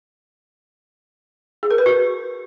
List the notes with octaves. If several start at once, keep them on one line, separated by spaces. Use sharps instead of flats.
G#4
A#4
B4
F#4